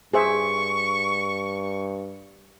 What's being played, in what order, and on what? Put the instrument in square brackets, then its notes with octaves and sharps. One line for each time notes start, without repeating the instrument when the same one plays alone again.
[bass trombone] G2 [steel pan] G#4 C5 E5 [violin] C#6